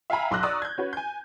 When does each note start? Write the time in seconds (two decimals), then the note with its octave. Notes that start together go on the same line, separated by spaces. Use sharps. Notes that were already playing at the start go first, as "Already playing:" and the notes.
0.10 E5 F5 G5 G#5 A#5 B5
0.31 B1 C6 D6 E6 F#6 A#6
0.43 D5 A#5 C#6 D#6 E6
0.62 G6 G#6
0.78 C#4 F#4 B4
0.93 G#5 G6